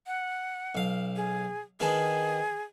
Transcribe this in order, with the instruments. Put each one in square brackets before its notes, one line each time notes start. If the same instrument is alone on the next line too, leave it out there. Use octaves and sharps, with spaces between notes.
[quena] F#5
[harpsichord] B1 F5
[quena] G#4
[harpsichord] D#3 B3 D4 [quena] G#4